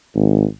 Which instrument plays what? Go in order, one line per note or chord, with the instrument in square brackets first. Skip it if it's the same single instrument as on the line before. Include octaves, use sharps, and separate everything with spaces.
[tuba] G#1